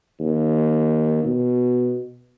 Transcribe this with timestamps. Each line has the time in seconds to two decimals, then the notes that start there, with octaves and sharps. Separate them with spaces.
0.20 D#2
1.25 B2